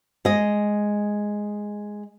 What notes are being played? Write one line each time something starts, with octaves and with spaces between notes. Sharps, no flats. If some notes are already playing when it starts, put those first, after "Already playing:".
G#3 D#5